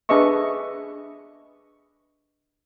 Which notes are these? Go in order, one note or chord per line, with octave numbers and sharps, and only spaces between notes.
D4 G#4 B4 D#5 E5 C#6